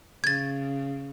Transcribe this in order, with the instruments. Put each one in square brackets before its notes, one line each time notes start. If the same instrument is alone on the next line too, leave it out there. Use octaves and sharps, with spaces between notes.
[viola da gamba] C#3 [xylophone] G#6 A6